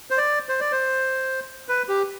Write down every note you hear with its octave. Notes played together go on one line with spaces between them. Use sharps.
C5
D5
C5
D5
C5
B4
G4